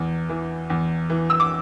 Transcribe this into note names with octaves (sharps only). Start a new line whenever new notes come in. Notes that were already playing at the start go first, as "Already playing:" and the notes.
Already playing: E2 E3
E3
E2
E3
E6
D6